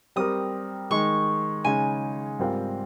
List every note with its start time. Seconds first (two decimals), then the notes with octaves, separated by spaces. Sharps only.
0.16 G3 C4 G4 A#4 D#6
0.90 D#3 G#3 D#4 C#6
1.64 C#3 G#3 D#4 G#5
2.39 G#2 G3 C4 F4 A#4